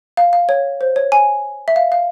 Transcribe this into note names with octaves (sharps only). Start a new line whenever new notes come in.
F5
F5
C#5
C5
C#5
G#5
E5
F5
F5